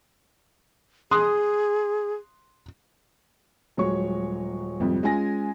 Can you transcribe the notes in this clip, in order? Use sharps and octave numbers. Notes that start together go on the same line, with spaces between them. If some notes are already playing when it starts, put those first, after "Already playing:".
G#4 C6 D#6 F#6
D#1 F#3 G#3 C#5 C#6
G#1 F2 C3 G3
G#3 C#4 F4 G#5 A#6